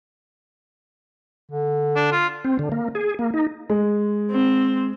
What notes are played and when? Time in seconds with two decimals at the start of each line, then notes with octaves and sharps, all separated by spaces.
1.52 D3
1.96 D4
2.12 F4
2.44 C4
2.59 D3
2.72 A#3
2.95 G#4
3.19 A#3
3.34 D#4
3.70 G#3
4.31 C4